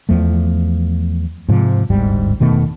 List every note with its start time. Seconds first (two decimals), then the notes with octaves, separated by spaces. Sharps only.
0.09 E2 F3 A3
1.49 G#2 C3 F3
1.90 D1 G1 G#2 G3
2.40 E1 B2 D#3 A3